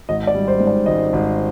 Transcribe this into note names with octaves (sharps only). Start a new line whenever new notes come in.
G#1 D#5
D5
G3
C5
G#2
D5
G#1 D#5
G#1